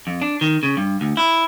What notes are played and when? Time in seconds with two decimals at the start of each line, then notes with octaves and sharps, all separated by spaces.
0.07 F2
0.22 D4
0.41 D#3
0.63 C#3
0.77 G2
1.01 D2
1.17 E4